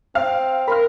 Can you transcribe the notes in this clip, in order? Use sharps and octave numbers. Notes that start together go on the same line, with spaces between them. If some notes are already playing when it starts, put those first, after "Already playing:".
C4 F5 F6
A#4 B5 C6 F6